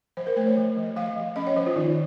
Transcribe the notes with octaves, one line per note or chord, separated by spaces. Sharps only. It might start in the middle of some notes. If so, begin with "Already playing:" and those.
F3 C5
A#4
A3 C5
C#5
F3
F3
F3 F5
F3
C#4 D#5
C#5
F3 C5
F4
D#3 D#4